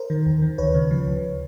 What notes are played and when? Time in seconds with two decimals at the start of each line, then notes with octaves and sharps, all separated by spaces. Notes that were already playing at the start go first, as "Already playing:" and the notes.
Already playing: A#4 C5
0.10 D#3
0.26 D#2
0.42 D#3
0.58 D2 B4 C#5
0.75 C#3
0.91 F3
1.07 D2